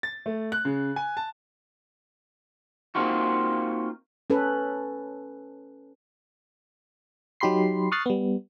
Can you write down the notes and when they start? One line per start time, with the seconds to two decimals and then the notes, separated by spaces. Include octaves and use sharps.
0.03 A6
0.26 A3
0.52 F#6
0.65 C#3
0.96 G#5
1.17 A5
2.95 A#3 C4 D#4 F4 F#4
4.30 C#4 A4 B4
7.40 F#3 D#4 G4 B5 C6 C7
7.92 C#6 D#6 F6 F#6 A6 C7
8.06 G3 B3